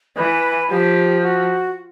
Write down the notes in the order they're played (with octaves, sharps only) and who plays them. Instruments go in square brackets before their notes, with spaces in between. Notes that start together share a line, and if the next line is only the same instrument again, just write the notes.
[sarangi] E3 [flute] B4
[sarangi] F3 [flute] G4
[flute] F#4